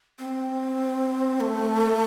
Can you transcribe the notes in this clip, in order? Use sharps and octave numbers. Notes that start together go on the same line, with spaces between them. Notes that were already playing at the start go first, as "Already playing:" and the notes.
C4
A3